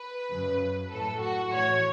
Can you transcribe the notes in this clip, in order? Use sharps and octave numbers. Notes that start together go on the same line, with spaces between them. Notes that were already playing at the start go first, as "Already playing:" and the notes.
Already playing: B4
F#2 C#3 F#3
A2 F#3 A4
F#4
A2 E3 C#5